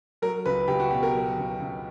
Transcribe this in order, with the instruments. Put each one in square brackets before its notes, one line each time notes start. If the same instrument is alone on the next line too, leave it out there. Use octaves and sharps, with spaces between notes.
[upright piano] F#3 A#4
C#2 B4
C#2 G4
F#4
B2 G4
A#4
F#3
C#2
C#2